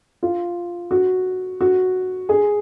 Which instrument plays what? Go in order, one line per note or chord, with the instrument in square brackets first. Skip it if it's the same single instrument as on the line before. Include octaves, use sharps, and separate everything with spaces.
[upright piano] F4
F#4
F#4
G#4